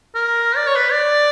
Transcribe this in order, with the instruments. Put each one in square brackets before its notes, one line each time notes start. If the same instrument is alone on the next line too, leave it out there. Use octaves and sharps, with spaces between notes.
[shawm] A#4
D5
C#5
B4
D5